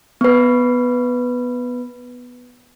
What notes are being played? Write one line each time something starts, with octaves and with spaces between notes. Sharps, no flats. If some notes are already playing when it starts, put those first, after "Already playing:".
B3 B4